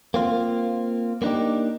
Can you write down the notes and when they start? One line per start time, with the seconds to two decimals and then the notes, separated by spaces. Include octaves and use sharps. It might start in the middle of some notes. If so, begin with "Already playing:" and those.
0.14 A#3 C4 F4
1.22 A#3 B3 D4 D#4 G4